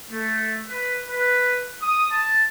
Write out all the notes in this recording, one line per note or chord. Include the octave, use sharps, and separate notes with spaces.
A3
B4
B4
D#6
A5